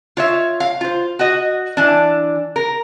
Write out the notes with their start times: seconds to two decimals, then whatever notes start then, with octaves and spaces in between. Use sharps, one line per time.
0.17 F4 C#5 E5
0.60 F5
0.81 F4 C5
1.19 F#4 D#5
1.77 E3 D4
2.56 A#4